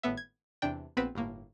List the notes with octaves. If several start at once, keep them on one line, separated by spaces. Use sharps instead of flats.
G#1 A2 B3 E5
G#6
E2 C3 D4 G5
A#1 B3 C4 B4 B5 E7
G1 A2 A#3